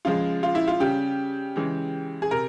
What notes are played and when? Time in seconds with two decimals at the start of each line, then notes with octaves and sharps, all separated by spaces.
0.05 C#3 F3 G#3 F4
0.43 F4
0.55 E4
0.68 F4
0.80 C#3 G3 G4
1.56 C#3 E3 G#3
2.22 G#4
2.31 C3 A#4